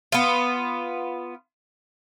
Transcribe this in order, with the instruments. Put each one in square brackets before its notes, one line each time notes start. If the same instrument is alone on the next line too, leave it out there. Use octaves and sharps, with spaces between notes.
[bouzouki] B3 F4